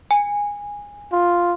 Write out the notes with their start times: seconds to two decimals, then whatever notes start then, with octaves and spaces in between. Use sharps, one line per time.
0.11 G#5
1.13 F4